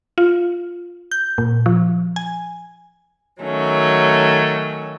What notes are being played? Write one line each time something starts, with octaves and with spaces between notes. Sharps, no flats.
F4
G6
A#2
F3
G#5
D#3 F#3 A3 C#4